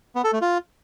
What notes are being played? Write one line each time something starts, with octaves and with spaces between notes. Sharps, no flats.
B3
A4
A3
F4